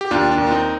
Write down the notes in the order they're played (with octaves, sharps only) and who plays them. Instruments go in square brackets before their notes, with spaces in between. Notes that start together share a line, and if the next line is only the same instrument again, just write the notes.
[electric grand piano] G4
[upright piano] D#2 [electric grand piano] D4 F4
[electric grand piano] D4
[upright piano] D#2
[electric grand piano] F4
C4 D#4